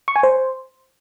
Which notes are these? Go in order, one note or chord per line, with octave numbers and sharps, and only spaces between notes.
C#6
G#5
C5